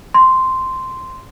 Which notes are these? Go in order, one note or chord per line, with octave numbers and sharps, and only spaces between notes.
C6